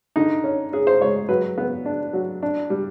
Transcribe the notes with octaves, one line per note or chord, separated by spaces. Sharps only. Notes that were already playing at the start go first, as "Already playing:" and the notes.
D3 D#4
C#4
C#4 G#4
C5
G#3 C#5
F#3 B4
B3
D4
F#3
D4
G3